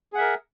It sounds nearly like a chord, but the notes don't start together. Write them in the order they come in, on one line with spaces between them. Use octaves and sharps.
G#4 F#5 E5 A#4